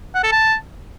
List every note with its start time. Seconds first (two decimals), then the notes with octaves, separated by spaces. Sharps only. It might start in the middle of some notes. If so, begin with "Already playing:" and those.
0.15 F#5
0.23 A4
0.32 A5